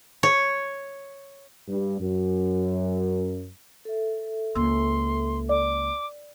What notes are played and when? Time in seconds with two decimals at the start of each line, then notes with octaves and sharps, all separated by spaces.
0.23 C#5
1.68 G2
2.00 F#2
3.85 A4 E5
4.55 C#2 A#3 C6 E6
5.49 D5 D6